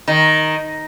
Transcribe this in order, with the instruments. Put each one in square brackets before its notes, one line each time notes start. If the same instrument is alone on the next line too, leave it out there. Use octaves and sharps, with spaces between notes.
[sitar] D#3